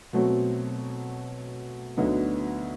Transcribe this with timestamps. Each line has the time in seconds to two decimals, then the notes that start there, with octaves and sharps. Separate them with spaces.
0.13 B2 F#3 A3 C4
1.97 D2 D3 F#3 B3 D#4